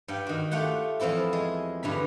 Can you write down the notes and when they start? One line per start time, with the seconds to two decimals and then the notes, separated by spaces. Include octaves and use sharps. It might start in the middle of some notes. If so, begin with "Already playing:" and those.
0.08 G2 F#5 G5
0.26 D#3 F#4
0.51 A3 F4 G4 F#5 G5
1.00 E2 F3 C4 E4 A4
1.33 G#3
1.83 G2 B2 D3 B5